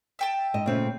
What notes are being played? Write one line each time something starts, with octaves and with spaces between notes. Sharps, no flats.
E5 G5 A5
G#2 D#5
A#2 C#3 A3 C4